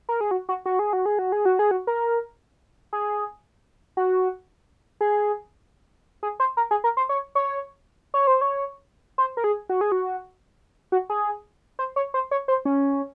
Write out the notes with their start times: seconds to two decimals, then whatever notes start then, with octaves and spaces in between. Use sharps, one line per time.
0.09 A#4
0.21 G#4
0.31 F#4
0.49 F#4
0.66 F#4
0.79 G#4
0.93 F#4
1.06 G#4
1.19 F#4
1.32 G#4
1.45 F#4
1.59 G#4
1.71 F#4
1.87 A#4
2.93 G#4
3.97 F#4
5.01 G#4
6.23 G#4
6.40 C5
6.57 A#4
6.71 G#4
6.84 A#4
6.97 C5
7.09 C#5
7.35 C#5
8.14 C#5
8.27 C5
8.41 C#5
9.18 C5
9.37 A#4
9.44 G#4
9.69 F#4
9.81 G#4
9.92 F#4
10.92 F#4
11.10 G#4
11.79 C5
11.96 C#5
12.14 C5
12.31 C#5
12.48 C5
12.65 C#4